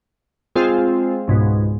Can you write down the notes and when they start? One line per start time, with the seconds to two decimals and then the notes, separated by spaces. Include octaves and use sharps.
0.55 G#3 C4 F4 G#4
1.28 C#2 G#2 B2